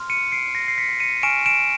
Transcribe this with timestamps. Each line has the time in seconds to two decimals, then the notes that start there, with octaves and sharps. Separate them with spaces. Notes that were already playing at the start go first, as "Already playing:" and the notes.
Already playing: C6 F6
0.10 C#7 D#7
0.32 C7 D7
0.55 A#6 C7
0.68 C7
0.78 B6 C#7
1.00 C#7 D#7
1.23 G#5 C#6 F6 D7 E7
1.46 D7 E7